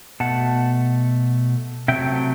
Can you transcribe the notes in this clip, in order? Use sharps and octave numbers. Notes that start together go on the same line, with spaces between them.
B2 A3 F#5 A5
C3 F#3 A3 E5 G5